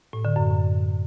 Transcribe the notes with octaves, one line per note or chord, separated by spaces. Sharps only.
A2
D3
F#2